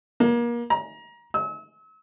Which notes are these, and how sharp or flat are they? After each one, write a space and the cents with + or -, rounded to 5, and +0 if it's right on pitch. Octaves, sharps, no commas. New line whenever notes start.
A#3 +30
A#5 +25
E6 -40